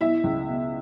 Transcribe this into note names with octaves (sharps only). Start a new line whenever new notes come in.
B2 E4 E5
C#2
B2